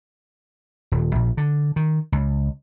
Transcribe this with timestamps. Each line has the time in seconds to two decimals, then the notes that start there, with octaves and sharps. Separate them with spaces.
0.92 D#1
1.15 A#1
1.37 D3
1.76 D#3
2.12 C#2